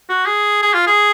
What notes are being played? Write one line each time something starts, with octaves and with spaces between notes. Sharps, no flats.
F#4
G#4
G#4
F4
G#4